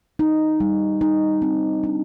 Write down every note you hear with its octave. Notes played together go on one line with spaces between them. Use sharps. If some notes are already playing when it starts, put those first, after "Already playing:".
D#4
G3
D#4
C4
D4